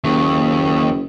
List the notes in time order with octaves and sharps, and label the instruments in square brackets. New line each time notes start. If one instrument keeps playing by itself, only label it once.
[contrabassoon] F#1 [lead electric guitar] D#2